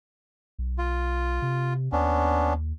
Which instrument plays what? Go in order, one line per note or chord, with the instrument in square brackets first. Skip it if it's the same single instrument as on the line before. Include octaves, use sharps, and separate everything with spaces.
[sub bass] B1
[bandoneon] F4
[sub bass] C3
[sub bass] D#2 [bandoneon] B3 C#4 D4